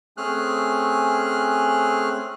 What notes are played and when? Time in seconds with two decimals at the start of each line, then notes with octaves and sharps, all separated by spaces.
0.17 A3 C4 C#4 G#4 F6 F#6